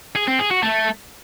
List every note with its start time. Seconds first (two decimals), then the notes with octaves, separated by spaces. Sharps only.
0.16 G#4
0.28 C4
0.39 G#4
0.51 F#4
0.63 A3